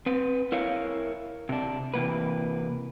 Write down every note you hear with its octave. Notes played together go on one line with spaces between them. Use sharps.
C4 B4
E4 A#4 C#5 F5
C3 D4
C3 E3 A#3 B4